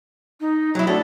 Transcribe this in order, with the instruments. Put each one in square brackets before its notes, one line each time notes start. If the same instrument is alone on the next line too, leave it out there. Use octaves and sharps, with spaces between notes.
[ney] D#4
[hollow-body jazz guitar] F#3 E4 [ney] C#5
[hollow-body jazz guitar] A3 F#4 A4 [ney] D4